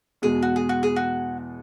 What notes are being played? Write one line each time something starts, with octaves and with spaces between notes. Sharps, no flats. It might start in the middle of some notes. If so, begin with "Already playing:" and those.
E2 B2 G#3 G#4
F#4
G#4
F#4
G#4
F#4